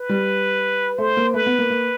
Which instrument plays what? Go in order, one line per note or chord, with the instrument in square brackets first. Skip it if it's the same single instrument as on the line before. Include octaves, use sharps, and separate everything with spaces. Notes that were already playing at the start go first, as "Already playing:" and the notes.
Already playing: [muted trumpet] B4
[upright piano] G3
[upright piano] A3 [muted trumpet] C5
[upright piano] A#3
[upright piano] A3 [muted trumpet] B4
[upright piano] B3
A#3
A#3